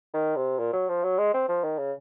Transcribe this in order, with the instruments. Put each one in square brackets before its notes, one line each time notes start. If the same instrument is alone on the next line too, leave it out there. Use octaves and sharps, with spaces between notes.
[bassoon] D#3
C3
A#2
F#3
F3
F#3
G#3
C4
F3
D#3
C#3